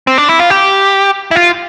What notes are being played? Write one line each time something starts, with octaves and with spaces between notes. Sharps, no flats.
C4
D4
E4
F4
G4
E4
F4